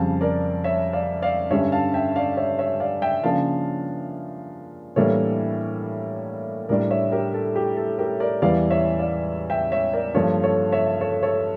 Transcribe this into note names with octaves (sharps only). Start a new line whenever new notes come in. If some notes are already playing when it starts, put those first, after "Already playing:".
Already playing: F2 C#3 G3 F5 A5
A#4 D5
C#5 E5
D5 F5
D5 F5
G2 D3 G3 C#4 C#5 E5
F5 A5
E5 G5
D5 F5
C#5 E5
C#5 E5
D5 F5
E5 G5
C#3 F3 A#3 D4 F5 A5
A2 E3 G3 A#3 D4 A4 C#5
A2 G3 D4 A#4 D5
C#5 E5
G4 A#4
A4
G4
A4
G4 A#4
A#4 D5
E2 E3 G3 D5 F5
C#5 E5
D5 F5
E5 G5
C#5 E5
A#4 D5
G2 F3 A#3 A4 C#5
A4 C#5
C#5 E5
A4 C#5
A4 C#5